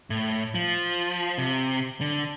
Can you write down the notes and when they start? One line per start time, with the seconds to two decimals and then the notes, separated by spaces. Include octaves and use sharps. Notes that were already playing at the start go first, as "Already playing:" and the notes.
0.10 A2
0.55 F3
1.38 C3
2.01 D3